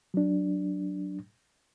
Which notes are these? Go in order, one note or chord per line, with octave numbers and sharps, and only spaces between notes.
F#3 D4